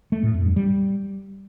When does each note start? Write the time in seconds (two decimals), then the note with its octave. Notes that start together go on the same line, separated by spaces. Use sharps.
0.12 A3
0.23 A2
0.34 F2
0.45 G2
0.56 G3